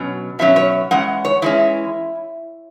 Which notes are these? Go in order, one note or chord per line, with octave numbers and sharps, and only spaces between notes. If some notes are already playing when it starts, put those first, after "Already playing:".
Already playing: B2 F#3 C#4
B2 F#3 C#4 E5
C#5
E3 G#3 C#4 F#5
C#5
E3 G#3 C#4 E4